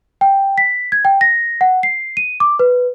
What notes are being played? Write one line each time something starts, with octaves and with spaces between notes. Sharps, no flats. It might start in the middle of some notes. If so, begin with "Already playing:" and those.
G5
B6
G#6
G5
A#6
F#5
C7
D#7
D6
B4